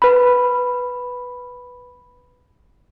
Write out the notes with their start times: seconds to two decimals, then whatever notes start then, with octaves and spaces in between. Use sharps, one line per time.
0.02 B4 B5